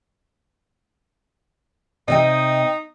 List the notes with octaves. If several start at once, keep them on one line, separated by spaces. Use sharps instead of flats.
C3 D#4 D#5 G5